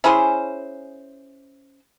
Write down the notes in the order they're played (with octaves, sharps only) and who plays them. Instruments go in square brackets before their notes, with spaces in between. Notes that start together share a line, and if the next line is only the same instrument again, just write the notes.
[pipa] C#4 E4 G#4 C5